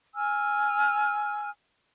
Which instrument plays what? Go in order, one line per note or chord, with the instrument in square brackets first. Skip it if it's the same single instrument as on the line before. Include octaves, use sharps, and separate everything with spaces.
[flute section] G#5 E6 F6